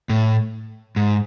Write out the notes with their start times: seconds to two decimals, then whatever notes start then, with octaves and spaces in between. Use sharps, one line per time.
0.10 A2
0.96 G#2